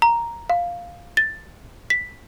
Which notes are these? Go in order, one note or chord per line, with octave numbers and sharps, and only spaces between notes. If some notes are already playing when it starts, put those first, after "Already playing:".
A#5
F5
A6
B6